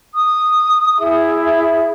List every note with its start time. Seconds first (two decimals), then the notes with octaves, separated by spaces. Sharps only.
0.14 D#6
0.99 E4 G#4 E5